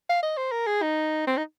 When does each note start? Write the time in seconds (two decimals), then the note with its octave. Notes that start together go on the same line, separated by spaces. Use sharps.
0.09 F5
0.23 D#5
0.37 C5
0.52 A#4
0.67 G#4
0.82 D#4
1.27 C4
1.37 D#4